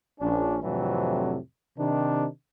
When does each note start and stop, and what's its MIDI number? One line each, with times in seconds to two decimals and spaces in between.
0.20 0.58 34
0.20 0.58 61
0.20 0.58 62
0.63 1.37 41
0.63 1.37 45
0.63 1.37 48
0.63 1.37 52
0.63 1.37 54
0.63 1.37 62
1.78 2.27 48
1.78 2.27 51
1.78 2.27 62